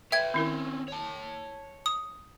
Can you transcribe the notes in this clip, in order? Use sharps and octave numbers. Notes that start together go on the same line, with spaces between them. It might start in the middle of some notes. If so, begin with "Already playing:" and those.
B4 C#5 E5 G5 G#6
D#3 C4 C#4 E4 A#4
C#5 A5
D#6